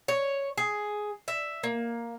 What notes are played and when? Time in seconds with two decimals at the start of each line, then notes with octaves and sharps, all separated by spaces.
0.08 C#5
0.58 G#4
1.28 E5
1.63 A#3